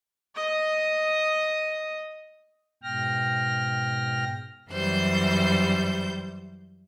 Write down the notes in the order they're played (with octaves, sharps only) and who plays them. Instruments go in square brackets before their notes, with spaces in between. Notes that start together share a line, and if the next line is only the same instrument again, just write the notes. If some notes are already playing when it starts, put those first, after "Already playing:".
[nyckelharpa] D#5 D#6
[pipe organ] G#2 B2 G5 F6 A#6
[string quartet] F#2 E3 G3 C5 G6